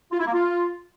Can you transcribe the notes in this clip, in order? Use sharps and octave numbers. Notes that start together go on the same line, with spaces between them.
F4
E4
A#3
F4